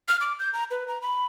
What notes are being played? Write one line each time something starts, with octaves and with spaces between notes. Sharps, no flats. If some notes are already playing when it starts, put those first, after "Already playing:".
F6
D6
G6
A#5
B4
A#5
B5